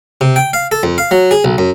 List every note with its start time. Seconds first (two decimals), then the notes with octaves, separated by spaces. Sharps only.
0.21 C3
0.36 G5
0.53 F5
0.72 A4
0.83 F2
0.98 F5
1.11 F#3
1.31 G#4
1.44 B1
1.58 F#2